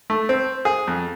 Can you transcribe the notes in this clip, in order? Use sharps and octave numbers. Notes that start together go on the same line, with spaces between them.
A3
C4
G#4
F2